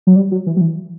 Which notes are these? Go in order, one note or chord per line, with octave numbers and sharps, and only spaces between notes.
F#3
G3
F#3
E3
F#3
E3